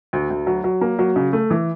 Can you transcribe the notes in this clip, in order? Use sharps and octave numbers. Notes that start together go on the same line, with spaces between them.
D2
D2
F#3
F#3
A#3
F#3
C#3
A3
E3